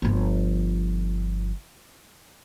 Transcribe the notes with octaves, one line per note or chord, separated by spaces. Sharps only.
G1 F3